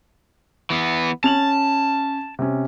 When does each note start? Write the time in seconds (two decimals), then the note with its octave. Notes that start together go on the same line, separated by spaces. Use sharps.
0.70 E3 B3
1.24 C#4 A5 F7 F#7
2.39 C3 C#4